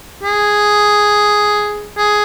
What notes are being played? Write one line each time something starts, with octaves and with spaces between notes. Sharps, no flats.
G#4
G#4